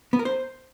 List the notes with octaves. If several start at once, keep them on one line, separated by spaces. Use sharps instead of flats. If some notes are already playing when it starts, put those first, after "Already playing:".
B3
A#4
C5